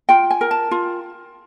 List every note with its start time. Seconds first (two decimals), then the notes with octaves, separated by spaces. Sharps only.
0.09 F4 G5
0.31 G#5
0.41 A#4
0.51 A5
0.71 F4